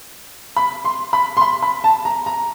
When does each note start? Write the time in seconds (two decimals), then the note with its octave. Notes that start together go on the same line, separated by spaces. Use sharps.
0.56 B5
0.85 C6
1.13 B5
1.37 C6
1.41 B5
1.63 B5
1.84 A5
2.05 A#5
2.26 A#5